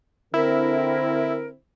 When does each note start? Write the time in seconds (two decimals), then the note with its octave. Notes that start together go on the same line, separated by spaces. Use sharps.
0.34 D3 C4 E4 A#4